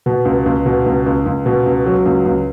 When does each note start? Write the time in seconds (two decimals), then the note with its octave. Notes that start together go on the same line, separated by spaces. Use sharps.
0.06 B2
0.25 C#2
0.46 C#2
0.66 B2
0.86 C#2
1.06 C#2
1.26 C#2
1.46 B2
1.66 C#2
1.86 F#3
2.06 C#2
2.26 C#2